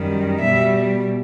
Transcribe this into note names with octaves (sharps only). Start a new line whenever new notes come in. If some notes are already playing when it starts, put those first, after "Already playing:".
Already playing: F#2 D#3 G3
B2 G3 E5